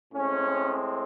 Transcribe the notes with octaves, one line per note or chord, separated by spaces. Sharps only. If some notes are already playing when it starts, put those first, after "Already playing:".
A2 G#3 C4 C#4